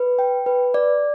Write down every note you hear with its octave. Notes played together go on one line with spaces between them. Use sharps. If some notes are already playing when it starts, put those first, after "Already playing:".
Already playing: B4
G5
B4
D5